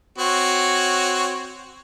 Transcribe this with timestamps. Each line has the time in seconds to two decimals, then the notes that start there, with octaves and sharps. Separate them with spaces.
0.18 C4 F#4 C#5